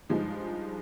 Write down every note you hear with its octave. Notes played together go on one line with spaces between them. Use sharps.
G2 F3 G#3 D#4